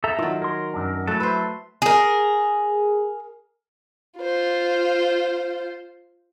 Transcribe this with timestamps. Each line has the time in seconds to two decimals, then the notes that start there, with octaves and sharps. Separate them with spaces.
0.04 A4 E5 A#5
0.19 D#3 F#3 F4
0.42 A#4 C#5 C6
0.74 F#2 D4
1.08 F#3 A3 E4 A4 A5
1.20 B4 C5
1.82 G#4 A#4
4.19 F4 C5